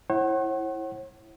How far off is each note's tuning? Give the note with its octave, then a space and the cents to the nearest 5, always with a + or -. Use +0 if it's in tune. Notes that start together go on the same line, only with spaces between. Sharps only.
E4 +0 C#5 -45 F#5 +25